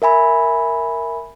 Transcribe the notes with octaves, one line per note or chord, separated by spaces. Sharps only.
A#4 E5 G#5 B5